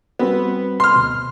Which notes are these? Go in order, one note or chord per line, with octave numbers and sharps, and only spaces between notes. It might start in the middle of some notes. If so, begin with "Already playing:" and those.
G3 B3 C4 F#4
C6 F6
D2 B2